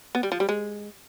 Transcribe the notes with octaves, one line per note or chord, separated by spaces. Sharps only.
B3
G3
F3
G3
G#3